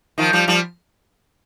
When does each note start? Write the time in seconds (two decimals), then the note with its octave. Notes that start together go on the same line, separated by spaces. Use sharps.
0.18 D#3 F3
0.33 F3 G3
0.48 F3 G3